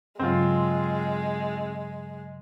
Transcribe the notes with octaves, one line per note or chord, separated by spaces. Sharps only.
G2 C#3 F#3 G#3 C4 F4